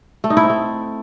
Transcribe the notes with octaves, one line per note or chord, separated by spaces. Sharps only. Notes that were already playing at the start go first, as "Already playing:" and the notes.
A3
D#4
E4
C4
A3